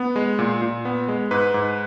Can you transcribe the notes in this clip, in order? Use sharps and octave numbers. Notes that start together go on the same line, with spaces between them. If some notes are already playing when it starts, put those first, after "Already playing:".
Already playing: B3
G#3
A#2
A#2
B3
G#3
G#2 B4
G#2